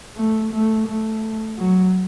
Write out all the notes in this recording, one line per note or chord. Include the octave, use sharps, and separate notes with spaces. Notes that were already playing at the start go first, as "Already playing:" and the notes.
A3
A3
A3
F#3